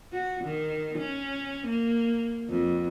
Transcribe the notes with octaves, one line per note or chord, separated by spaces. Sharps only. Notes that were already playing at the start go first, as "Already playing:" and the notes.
F#4
D#3
C#4
A#3
F2